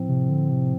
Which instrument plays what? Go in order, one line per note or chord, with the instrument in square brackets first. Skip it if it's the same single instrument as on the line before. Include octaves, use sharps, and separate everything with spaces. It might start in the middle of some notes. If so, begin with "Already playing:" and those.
Already playing: [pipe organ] A2 F3 C4
[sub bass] C3
D3
C3